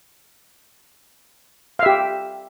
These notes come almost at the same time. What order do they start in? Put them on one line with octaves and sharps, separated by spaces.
F5 E5 G4